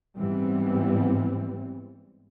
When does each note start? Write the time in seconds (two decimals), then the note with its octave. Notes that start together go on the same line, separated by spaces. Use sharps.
0.18 G#2 E3 G3 B3 C4